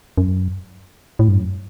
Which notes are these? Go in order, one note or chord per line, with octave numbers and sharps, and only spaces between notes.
F#2
A2
G2
F#2